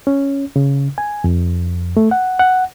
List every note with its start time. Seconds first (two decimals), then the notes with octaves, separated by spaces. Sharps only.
0.07 C#4
0.56 C#3
0.98 G#5
1.24 F2
1.97 A3
2.11 F#5
2.39 F#5